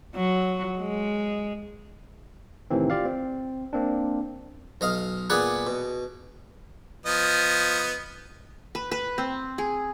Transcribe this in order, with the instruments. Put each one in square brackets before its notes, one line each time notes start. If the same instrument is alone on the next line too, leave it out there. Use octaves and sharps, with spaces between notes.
[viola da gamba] F#3
G#3
[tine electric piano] A2 C3 D#3 E3 C4
F4 G4 D5 F5
C4
A#3 C4 D4
[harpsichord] B1 D#5 F5
A#2 B3 G#4 B4 D5 F#5
B2
[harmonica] F3 B3 D#5
[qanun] B4
B4
C4
G#4